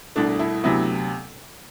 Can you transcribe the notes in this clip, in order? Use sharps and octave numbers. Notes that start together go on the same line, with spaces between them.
C2 B2 A3 D4
E4
D2 C3 F#3 B3 E4